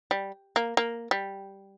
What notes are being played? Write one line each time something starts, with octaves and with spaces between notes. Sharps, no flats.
G3
A#3
A#3
G3